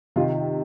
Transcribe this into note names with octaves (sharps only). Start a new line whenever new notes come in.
C3 D#3 F4